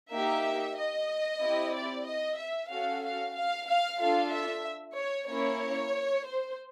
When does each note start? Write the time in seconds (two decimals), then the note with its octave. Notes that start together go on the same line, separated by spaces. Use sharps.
0.12 A#3 D#4 G4 E5
0.76 D#5
1.41 C4 E4 G4
1.73 D5
2.06 D#5
2.38 E5
2.70 C#4 F#4 A4 F5
3.03 F5
3.35 F5
3.67 F5
3.99 D4 F4 A4 F5
4.32 E5
4.97 C#5
5.29 A#3 C#4 E4 C#5
6.26 C5